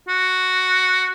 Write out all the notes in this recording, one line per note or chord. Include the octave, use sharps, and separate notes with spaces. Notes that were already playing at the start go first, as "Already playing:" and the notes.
F#4